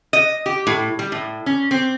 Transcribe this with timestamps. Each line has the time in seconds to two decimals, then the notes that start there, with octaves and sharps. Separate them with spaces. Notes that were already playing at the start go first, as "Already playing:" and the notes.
0.13 D#5
0.46 G4
0.67 A2
0.99 G3
1.12 A2
1.46 C#4
1.71 C4